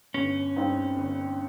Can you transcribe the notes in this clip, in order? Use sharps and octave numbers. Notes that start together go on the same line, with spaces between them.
G1 C#4
G2 G3 C4 D#4
G1